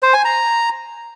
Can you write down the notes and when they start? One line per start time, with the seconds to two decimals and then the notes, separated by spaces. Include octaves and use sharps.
0.02 C5
0.14 G#5
0.25 A#5